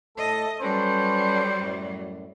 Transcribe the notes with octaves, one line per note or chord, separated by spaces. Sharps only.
A2 A3 A4 D#5
F#3 G3 C#4 A4 B4 C5
F#2 A2